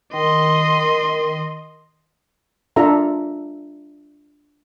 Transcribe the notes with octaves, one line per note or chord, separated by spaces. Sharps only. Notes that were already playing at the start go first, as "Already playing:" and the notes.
D#3 D#5 C6
D4 F4 A4 E5 A#5